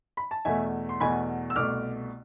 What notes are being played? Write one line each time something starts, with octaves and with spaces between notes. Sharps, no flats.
B5
A5
E2 B2 A3 E5 G#5
C6
E2 B2 A3 G#5 B5
E6
C2 B2 A3 D6 F6